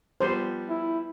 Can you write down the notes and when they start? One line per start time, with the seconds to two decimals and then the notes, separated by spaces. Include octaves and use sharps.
0.20 F3 G3 B3 C5
0.69 E4